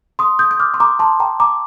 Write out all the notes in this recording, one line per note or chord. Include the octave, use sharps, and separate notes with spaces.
C6 D#6
D#6 G6
G6
D6 F6
C6
A#5 D6
A5 C6
G5 A#5
A#5 D6